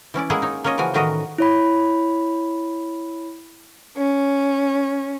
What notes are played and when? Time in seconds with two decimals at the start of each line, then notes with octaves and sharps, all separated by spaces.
0.14 E3 C#4 E4 D5
0.30 G#3 A#3 E4 G#4 C#5 F#5
0.42 D#4 C#5
0.64 A#3 C#4 F4 C#5 D#5
0.78 C#3 E3 F3 F#4 G#5
0.94 A2 D#3 E3 F#4 A#4 D#5
1.38 E4 C#5 B5
3.96 C#4